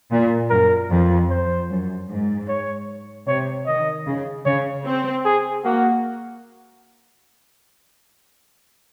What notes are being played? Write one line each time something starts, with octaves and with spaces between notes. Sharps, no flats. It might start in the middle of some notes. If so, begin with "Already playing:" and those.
A#2
F#2 A#4
F2
C5
F#2
G#2
C#5
C3 C#5
D#3 D#5
C#3
C#3 C#5
C4
G#4
A#3 F#4